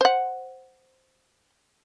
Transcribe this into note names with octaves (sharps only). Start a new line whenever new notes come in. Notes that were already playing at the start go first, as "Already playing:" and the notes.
C5 F#5